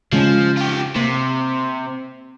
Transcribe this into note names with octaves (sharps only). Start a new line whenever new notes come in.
C#3 F3 G#3 C#4
F4 G4
C3 A#3